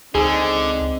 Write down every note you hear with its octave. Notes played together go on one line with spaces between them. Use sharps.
C#2 D3 C4 D#4 G#4